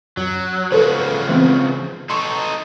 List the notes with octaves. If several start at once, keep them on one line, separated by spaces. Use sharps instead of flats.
F#2 F#3
C#3 F3 B3 F#4 A4 C5
E3 B3 C4
D#4 A4 C6 C#6